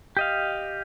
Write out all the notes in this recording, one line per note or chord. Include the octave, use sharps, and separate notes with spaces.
G4 D#5 F5